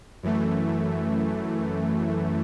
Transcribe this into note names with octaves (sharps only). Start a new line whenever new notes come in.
F#2 E3 A3